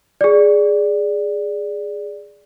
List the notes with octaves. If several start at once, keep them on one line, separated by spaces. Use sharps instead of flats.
G#4 D5